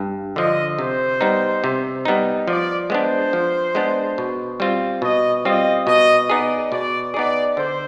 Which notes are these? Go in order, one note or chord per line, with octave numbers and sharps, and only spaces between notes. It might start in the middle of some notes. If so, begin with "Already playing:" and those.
Already playing: G2
D3 F3 D#5
C3 C5
G3 B3 D#4
C3
G3 B3 D#4
F3 D5
G#3 B3 D4 C5
F3
G#3 B3 D4
B2
G3 C4 F4
B2 D#5
G3 C4 F4 D#5
B2 D#5
B3 D#4 G#4 D5
B2 D5
B3 D#4 G#4 D5
D3 C5